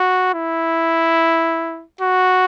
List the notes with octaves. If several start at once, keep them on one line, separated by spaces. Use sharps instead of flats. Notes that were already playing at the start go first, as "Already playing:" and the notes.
Already playing: F#4
E4
F#4